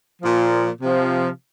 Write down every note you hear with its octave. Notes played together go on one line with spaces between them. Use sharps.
A#2 F3
C3 F3